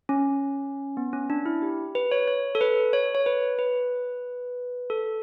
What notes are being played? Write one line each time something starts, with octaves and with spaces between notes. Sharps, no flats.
C#4
B3
C#4
D4
E4
G4
B4
C#5
C#5
A4
B4
C#5
C#5
B4
B4
A4